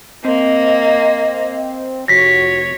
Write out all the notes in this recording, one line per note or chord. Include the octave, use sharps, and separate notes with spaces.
A#3 C4 D#5
F1 F#4 C#5 A#6 B6